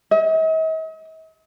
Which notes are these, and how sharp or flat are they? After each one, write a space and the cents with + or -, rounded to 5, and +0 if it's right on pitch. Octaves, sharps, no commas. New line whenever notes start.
D#5 +45